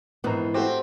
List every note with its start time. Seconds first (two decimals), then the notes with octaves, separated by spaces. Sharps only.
0.24 A#1 G#2 E3 B3 A#5
0.54 A3 C4 F#4 G4